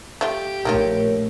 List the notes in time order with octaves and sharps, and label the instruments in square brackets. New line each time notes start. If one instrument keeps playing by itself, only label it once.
[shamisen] A3 F4 [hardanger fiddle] G4
[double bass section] A#1 A3 [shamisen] D#3 A#3 F4 [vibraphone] A#4 C#5